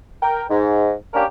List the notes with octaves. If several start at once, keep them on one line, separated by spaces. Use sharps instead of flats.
A#4 G5
G#2
A#3 C#4 D4 G4 A#4